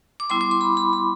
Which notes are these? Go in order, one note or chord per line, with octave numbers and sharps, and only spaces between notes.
D6
G3 B3 E4 C6
D6
C6
B5
B5
B5